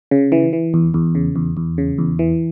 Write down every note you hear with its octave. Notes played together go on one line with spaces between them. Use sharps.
C#3
E3
E3
E2
E2
C#3
E2
E2
C#3
E2
E3